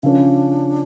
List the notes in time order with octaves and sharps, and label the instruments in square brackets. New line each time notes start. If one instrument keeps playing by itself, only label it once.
[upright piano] C#3 F3 C#4 [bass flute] D4